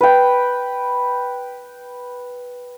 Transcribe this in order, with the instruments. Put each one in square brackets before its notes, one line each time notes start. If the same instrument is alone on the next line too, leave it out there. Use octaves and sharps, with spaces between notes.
[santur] B4 G5